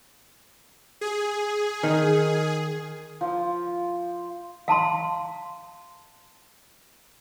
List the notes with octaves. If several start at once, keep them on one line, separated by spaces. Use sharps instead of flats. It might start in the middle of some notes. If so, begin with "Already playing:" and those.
G#4
D#3
F3
F5 A5 A#5 C6